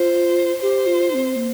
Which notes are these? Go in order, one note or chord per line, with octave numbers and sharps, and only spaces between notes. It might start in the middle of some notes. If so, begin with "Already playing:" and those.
Already playing: F4 C5
G4 C5
F4
D#4
C4
A#3